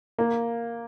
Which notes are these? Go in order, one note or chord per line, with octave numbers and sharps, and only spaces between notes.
A#3